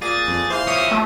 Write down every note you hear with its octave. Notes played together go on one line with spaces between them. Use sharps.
A#2 G#4 A6
F2
E3 C5 F5 C6
C#4 E4 D#6
A3